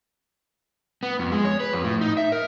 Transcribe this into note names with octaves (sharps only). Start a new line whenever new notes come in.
B3
F2
G#3
C#5
B4
F2
A2
D#4
E5
A#4